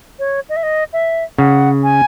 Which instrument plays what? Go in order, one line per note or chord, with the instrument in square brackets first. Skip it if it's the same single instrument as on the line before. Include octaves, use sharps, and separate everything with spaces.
[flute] C#5
D#5
E5
D#5
E5
[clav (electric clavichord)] C#3 [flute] F#5
[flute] G#5